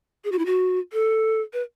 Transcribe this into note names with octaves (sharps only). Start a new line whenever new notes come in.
G#4
F#4
E4
F#4
A4
B4